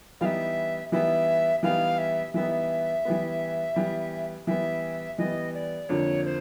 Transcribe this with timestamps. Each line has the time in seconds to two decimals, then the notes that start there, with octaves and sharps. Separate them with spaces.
0.21 E3 G3 B3 D#4 E5 F5
0.92 E3 G3 B3 D#4 E5
1.63 E3 G3 B3 D#4 F5
1.98 E5
2.34 E3 G3 B3 D#4 E5
3.05 E3 G3 B3
3.76 E3 G3 B3
4.47 E3 G3 B3 E5
5.18 E3 G3 B3 D#5
5.54 D5
5.89 F2 D3 F3 A#3 D4 C#5
6.25 C5